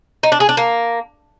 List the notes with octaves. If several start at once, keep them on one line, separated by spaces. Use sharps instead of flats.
D#4
D4
G#4
D4
A#3